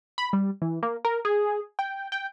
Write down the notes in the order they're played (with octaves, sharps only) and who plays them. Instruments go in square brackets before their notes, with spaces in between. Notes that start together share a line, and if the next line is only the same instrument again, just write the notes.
[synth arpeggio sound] B5
G3
E3
A#3
A#4
G#4
G5
G5